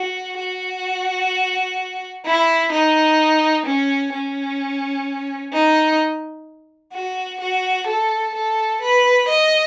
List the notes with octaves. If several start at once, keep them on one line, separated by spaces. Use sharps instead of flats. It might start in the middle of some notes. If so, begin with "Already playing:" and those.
Already playing: F#4
F#4
E4
D#4
C#4
C#4
D#4
F#4
F#4
A4
A4
B4
D#5